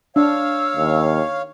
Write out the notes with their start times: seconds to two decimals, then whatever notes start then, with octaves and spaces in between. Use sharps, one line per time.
0.16 D4 C#5 F5 E6
0.76 D#2